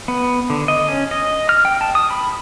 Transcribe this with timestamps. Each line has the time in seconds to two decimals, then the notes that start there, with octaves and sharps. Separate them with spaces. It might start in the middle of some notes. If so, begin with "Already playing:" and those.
0.08 B3
0.50 D3
0.68 D#5
0.88 C#4
1.11 D#5
1.49 F6
1.65 G5
1.81 A5
1.95 D#6
2.10 B5